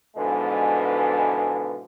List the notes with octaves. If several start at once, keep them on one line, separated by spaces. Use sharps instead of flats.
G#2 B2 D3 E3 F3 G#3